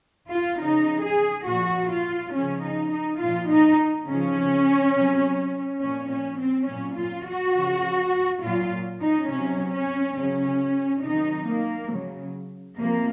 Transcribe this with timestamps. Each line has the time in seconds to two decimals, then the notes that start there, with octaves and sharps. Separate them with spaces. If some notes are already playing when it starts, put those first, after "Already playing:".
0.30 F4
0.59 C#3 F3 D#4
1.03 G#4
1.46 A#2 F3 F#4
1.90 F4
2.33 C#3 F3 C#4
2.62 D#4
2.91 D#4
3.20 A#2 F3 F4
3.50 D#4
4.07 C#3 F3 C#4
4.94 C3 F#3
5.82 A#2 F3 C#4
6.11 C#4
6.40 C4
6.68 A#2 F#3 C#4
6.98 F4
7.27 F#4
7.55 C#3 F3
8.43 A#2 F#3 F4
9.01 D#4
9.29 C3 F#3 C#4
9.73 C#4
10.16 C#3 F#3 C#4
11.04 C3 D#3 F#3 D#4
11.47 A#3
11.92 C#3 F#3
12.78 C3 F3 A#3